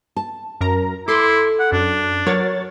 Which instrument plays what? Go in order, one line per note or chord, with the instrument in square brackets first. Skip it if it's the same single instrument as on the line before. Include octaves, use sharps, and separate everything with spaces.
[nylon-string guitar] A5
[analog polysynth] F#2 A#4 A#5
[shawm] E4 [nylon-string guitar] A4 [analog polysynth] C6 D6
[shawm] F#5
[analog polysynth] F#2 [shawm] D4
[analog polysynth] F#3 C#5 A6 [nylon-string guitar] A#4